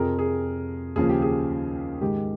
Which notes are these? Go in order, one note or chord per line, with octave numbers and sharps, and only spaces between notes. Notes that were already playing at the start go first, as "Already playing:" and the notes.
Already playing: F2 C3 F3 G#4 A#4
G#4
D#2 C#3 F3 G#4
G4
G#4
G#2 D#3 G#3 G4